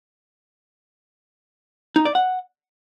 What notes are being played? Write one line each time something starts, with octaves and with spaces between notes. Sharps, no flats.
D#4
D5
F#5